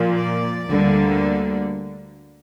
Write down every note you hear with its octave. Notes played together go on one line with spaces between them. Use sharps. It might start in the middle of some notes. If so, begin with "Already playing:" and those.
Already playing: A#2 F3 A#3
D5
D2 D3 G3 A#3